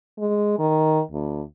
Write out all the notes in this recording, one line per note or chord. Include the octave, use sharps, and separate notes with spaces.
G#3
D#3
D2